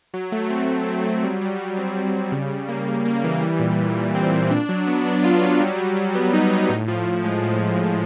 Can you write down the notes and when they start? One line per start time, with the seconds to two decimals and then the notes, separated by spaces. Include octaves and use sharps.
0.14 F#3
0.32 A3
0.50 C4
0.68 F#3
0.87 C4
1.05 F#3
1.23 G3
1.41 G3
1.59 G3
1.78 C4
1.96 C4
2.14 G3
2.32 C#3
2.51 C#3
2.69 A#3
2.87 A#3
3.05 A#3
3.24 E3
3.42 G3
3.59 A#2
3.78 A#2
3.96 A#2
4.15 C4
4.33 A#2
4.51 D4
4.69 F#3
4.87 B3
5.05 D4
5.24 F4
5.42 F#3
5.60 G3
5.78 G3
5.97 G3
6.15 B3
6.33 D#4
6.52 D#4
6.69 A2
6.88 F3
7.06 A2
7.24 G#3
7.42 A2